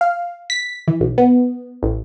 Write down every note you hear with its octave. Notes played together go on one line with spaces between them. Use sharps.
F5
B6
E3
B1
B3
A1